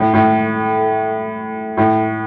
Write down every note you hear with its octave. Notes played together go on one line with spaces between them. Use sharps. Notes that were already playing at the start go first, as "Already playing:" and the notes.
Already playing: A2
A2
A2